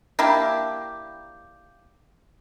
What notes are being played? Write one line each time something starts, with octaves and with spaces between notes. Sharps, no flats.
A#3 D4 E4 G4